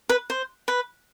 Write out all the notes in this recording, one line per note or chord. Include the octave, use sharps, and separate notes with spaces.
B4
C5
B4